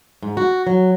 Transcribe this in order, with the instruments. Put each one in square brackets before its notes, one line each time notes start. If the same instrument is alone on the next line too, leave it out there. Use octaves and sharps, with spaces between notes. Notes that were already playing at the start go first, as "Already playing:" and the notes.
[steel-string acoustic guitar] G#2
F#4
F#3